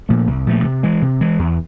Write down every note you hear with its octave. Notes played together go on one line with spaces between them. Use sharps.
A#2 F3 A3
C2
A#2 F3 A3
C3
E3 G#3
C3
E3 G#3
E2